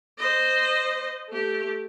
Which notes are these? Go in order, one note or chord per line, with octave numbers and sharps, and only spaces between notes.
C5 D#5
A3 G4